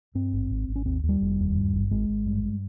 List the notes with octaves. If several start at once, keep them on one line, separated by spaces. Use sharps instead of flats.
G2 C4
G#1
G#1
G#1
C#4
D#2 C4
D#2
G3
F1
D#2
G2
G#1
G#1 G#3
G#1
G2
G2